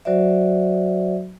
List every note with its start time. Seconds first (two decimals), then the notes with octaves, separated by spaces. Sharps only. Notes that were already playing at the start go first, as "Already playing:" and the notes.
0.05 F#3 F#4 C5 D5 E5